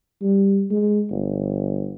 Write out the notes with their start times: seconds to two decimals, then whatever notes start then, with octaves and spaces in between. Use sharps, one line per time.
0.21 G3
0.71 G#3
1.10 G1